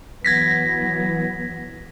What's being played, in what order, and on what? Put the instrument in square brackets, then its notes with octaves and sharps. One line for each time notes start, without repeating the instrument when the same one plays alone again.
[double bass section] E3 F#3 B3 [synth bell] G#6 A#6 B6